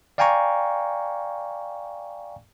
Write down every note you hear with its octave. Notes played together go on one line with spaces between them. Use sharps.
D5 F5 G5 G#5 A#5 C#6